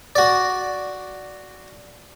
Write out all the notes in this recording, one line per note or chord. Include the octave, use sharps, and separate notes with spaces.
F#4 D5